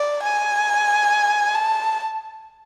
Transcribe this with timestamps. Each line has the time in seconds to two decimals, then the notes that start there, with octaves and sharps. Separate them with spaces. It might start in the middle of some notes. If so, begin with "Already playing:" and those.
Already playing: D5
0.23 G#5
1.54 A5